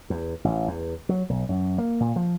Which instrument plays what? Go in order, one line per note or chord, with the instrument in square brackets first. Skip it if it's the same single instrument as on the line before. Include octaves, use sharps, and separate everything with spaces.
[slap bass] E2
A1
E2
F#3
B1
F#2
A#3
A#2
F3